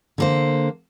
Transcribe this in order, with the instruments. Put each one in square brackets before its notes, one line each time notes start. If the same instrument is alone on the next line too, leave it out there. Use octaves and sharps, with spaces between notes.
[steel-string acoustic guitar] D3 A#3 C5